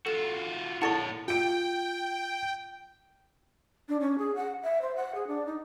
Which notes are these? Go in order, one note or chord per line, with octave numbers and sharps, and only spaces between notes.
F4 F#4 A4 E7
A#2 E4 A4 C#5 F#5 A5 C#6 A6
F4 G5 D7
D4
C#4
G#4
F#5
E5
C5
F#5
G#4
D4
D#4